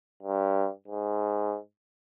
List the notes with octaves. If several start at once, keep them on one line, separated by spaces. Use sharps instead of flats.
G2
G#2